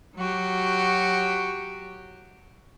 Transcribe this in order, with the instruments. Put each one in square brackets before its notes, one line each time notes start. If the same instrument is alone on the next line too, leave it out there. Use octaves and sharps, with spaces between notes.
[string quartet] F#3 F#4 G4